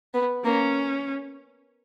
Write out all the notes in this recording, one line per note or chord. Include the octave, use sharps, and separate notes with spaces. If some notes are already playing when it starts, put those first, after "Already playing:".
B3
A#3 C#4